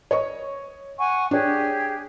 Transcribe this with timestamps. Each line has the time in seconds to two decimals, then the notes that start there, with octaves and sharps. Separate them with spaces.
0.11 C#5 D#5 C#6
0.98 F#5 G#5 C#6
1.31 D4 G4 G#4 C#5